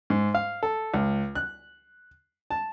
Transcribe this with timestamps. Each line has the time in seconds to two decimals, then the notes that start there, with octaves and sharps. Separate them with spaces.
0.10 G#2
0.34 F5
0.63 A4
0.94 C#2
1.35 F#6
2.51 A5